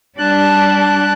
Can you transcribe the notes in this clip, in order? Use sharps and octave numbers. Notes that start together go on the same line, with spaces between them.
G3 D4 A5 F#6